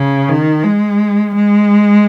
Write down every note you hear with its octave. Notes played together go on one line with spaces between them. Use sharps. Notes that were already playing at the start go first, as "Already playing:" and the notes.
Already playing: C#3
D#3
G#3
G#3